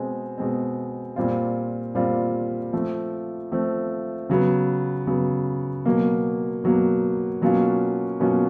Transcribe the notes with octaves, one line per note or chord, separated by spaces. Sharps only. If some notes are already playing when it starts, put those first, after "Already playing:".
Already playing: B2 G#3 C4
B2 G#3 C4
A#2 G3 C4 F4
A#2 G3 C4 F4
F3 A3 C4
F3 A3 C4
C#3 F#3 B3
C#3 F#3 B3
B2 F#3 A#3
B2 F#3 A#3
B2 F#3 A#3 C#4 F4
B2 F#3 A#3 C#4 F4